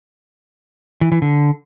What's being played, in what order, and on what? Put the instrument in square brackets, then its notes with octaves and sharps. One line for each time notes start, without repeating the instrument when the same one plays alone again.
[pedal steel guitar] E3
E3
D3